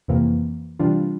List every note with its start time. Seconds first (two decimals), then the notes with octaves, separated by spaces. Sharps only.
0.08 F2 C3 E3 A#3
0.79 C3 E3 G3 D4 F4